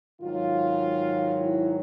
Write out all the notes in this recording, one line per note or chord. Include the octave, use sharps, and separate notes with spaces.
G#2 D#3 F#3 F4
E4